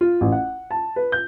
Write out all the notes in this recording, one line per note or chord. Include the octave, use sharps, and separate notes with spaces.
F4
A1
F#5
A5
B4
G6